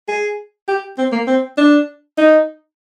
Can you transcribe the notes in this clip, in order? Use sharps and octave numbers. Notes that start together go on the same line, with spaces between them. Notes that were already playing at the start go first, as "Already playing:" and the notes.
G#4
G4
C4
A#3
C4
D4
D#4